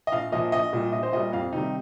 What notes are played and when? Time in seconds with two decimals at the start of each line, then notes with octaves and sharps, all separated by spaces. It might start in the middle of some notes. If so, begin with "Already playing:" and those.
0.07 D#5
0.12 A#1 F5
0.32 A#2 F3 D#5
0.52 A#1 D#5
0.73 A#2 G3
0.93 A#1 D#5
1.03 C5
1.13 A#2 G3 D#5
1.33 F2 F5
1.53 C3 D#3 G3 D#4